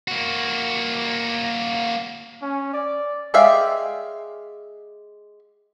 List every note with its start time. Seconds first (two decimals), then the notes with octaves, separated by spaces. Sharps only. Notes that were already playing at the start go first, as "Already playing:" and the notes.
0.08 A#3 F#4
2.42 C#4
2.73 D5
3.34 G#3 G4 D5 E5 F5